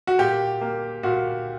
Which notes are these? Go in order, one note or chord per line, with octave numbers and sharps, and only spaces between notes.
F#4
A#2 G4
A#3
A#2 F#4